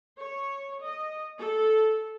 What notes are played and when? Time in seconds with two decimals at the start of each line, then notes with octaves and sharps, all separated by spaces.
0.19 C#5
0.83 D#5
1.38 A4